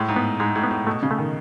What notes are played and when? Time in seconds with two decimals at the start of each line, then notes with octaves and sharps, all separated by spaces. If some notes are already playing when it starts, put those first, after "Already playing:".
Already playing: A2 G#3
0.09 G#2
0.16 B3
0.40 G#2 G#3
0.56 A2
0.63 B3
0.71 A2
0.87 B2 A3
1.03 C#3
1.11 A3
1.18 D#3